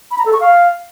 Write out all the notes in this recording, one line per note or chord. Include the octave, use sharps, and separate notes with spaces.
B5
A#5
A4
C#6
F5